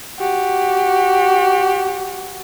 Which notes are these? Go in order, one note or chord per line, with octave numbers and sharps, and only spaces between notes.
F#4 G4